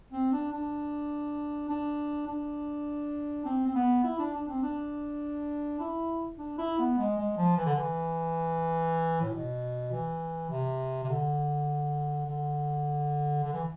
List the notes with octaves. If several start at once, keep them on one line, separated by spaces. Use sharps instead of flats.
C4
D4
D4
D4
D4
C4
C4
B3
E4
D4
D4
C4
D4
E4
D4
E4
B3
G#3
G#3
F3
E3
D3
E3
A2
B2
E3
C3
C3
D3
D3
D3
E3